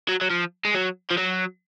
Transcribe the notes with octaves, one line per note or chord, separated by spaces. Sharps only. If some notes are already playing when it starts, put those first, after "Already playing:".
F#3
F#3
F3
G#3
F#3
F3
F#3